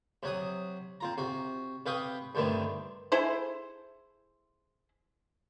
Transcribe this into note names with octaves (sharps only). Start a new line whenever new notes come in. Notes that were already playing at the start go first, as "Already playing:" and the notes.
C3 F#3 F#5 D#6
C4 F4 A#5
C3 F#4
C3 B4 F5 G5 C#6 D#6
G2 D3 D#3 A3 B3 C4
E4 G#4 A4 C5